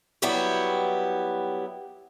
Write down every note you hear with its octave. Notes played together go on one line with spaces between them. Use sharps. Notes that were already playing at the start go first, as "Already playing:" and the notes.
F#3 G3 B3 E4 F#4 G4